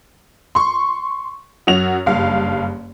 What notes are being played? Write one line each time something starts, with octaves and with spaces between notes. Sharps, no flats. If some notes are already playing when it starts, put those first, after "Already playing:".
C6 C#6
F#2 F#3 F#4 F7
F#1 G2 F5